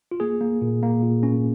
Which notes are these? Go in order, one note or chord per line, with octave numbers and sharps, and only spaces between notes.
F4
A#3 G#4
A#3
A#2
A#3
A#2
C#4